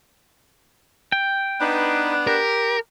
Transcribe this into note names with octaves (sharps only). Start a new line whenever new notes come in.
G5
B3 D4 D#4 B4
G4 A#4